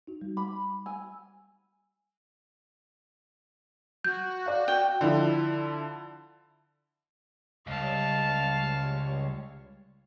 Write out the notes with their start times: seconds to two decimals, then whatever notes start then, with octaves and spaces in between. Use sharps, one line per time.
0.07 D#4 F#4
0.22 G3
0.37 B5 D6
0.86 G#5 E6
4.04 F#4 G6
4.46 D5 F5
4.68 G5
5.01 D3 F3 E4
7.67 C#2 G3 C#5 F5 A5